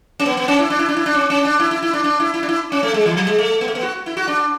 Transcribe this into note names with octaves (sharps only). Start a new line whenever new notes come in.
C#4
B3
B3
C#4
E4
D4
E4
D4
E4
D4
C#4
C#4
D4
E4
E4
E4
D4
D4
E4
E4
D4
E4
C#4
A3
G#3
E3
F#3
G#3
A3
B3
A3
B3
F#4
E4
F#4
D4